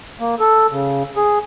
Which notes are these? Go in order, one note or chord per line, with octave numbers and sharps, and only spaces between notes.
A#3
A4
C#3
G#4